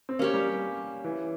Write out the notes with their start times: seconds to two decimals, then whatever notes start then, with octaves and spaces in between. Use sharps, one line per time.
0.09 C4
0.19 A#3 C#4 G4 C#5
0.34 G3
1.04 E3